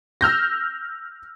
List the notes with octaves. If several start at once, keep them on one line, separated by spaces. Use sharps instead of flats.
E6 F6 G6 A#6